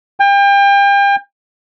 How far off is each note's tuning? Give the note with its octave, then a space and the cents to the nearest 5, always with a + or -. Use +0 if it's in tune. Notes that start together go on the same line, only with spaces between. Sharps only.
G5 +35